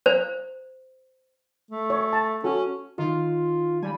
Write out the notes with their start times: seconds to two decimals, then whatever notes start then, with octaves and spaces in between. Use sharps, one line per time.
0.06 C5
1.71 A3
1.90 C#5
2.13 A5
2.44 C#4 F#4 A4
2.98 D#3 F4
3.82 G3 G#5 B5